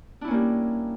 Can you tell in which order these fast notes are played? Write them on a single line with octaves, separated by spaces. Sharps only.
D4 E4 C#4 A#3 G3